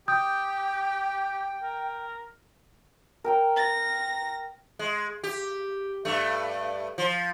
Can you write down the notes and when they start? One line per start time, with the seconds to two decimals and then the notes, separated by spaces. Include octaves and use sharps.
0.08 G4 G5 D#6 G6
1.61 A#4
3.24 A#4 G5 A#5
3.56 A#6
4.79 G#3
5.24 G4
6.05 G2 A3
6.98 F3